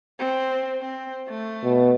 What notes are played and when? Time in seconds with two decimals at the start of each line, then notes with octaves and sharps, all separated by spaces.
0.19 C4
0.81 C4
1.29 A3
1.64 B2